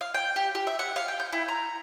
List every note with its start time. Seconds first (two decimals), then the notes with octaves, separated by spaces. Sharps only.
0.01 F5
0.14 G5
0.36 G4
0.55 G4
0.67 E5
0.79 F#5
0.96 F5
1.08 G5
1.20 G6
1.33 E4
1.48 A#5